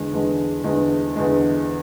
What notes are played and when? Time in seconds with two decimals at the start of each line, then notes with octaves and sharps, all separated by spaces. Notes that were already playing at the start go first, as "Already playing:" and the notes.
Already playing: E2 D3 G#3
0.13 E2 D3 G#3
0.64 E2 D3 G#3
1.16 E2 D3 G#3